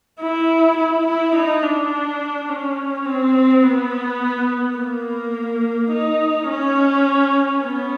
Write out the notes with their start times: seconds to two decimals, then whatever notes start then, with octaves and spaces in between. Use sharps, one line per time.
0.20 E4
0.77 E4
1.07 E4
1.35 D#4
1.63 D4
2.49 C#4
3.05 C4
3.63 B3
4.77 A#3
5.92 D#4
6.49 C#4
7.63 B3